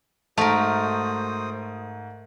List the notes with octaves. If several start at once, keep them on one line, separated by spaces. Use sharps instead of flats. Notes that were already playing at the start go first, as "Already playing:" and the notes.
G#2 A3 F#4 A#4 C5 D#6